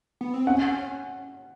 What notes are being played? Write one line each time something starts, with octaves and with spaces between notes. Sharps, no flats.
B3
C4
C#4 F#5